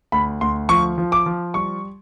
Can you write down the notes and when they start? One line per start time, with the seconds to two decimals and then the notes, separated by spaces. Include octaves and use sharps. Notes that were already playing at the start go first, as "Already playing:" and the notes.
0.12 D2 B5
0.41 D2 C6
0.69 F3 C#6
0.98 F3
1.12 D6
1.26 F3
1.54 G3 C#6